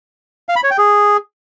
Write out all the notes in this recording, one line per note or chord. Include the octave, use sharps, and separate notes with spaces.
F5
B5
C#5
G5
G#4